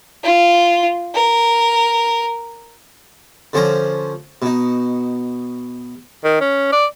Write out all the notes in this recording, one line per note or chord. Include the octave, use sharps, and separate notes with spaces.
F4
A#4
D3 F3 C#4 C5 A#5
B2 D#4
D#3
C#4
D5